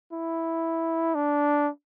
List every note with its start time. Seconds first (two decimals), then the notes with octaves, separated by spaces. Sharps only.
0.13 E4
1.15 D4